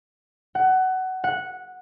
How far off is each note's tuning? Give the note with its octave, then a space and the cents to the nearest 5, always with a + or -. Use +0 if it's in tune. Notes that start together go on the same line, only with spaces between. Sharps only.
F#5 +20
F#5 -10